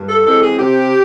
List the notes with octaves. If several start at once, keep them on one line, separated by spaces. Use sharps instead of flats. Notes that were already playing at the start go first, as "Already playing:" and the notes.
Already playing: G2
A4
E3 G#3 C4 A4
G#4
C3 G4